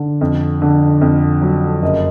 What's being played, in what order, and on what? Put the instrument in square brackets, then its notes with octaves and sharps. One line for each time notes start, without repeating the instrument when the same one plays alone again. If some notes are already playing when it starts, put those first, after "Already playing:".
Already playing: [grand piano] D3
F2
D3
F2
F#3
F#1 D#5